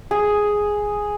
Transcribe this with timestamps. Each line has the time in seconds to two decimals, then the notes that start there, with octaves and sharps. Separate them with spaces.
0.11 G#4